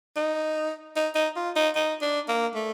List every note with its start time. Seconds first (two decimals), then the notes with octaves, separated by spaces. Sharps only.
0.16 D#4
0.96 D#4
1.15 D#4
1.36 F4
1.56 D#4
1.75 D#4
2.02 D4
2.28 A#3
2.55 A3